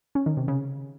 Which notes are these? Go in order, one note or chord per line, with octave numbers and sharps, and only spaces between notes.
C#4
D#3
C3
C#3